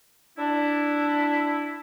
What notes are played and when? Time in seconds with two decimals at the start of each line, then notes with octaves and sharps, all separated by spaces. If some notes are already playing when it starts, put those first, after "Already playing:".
0.38 D4 E4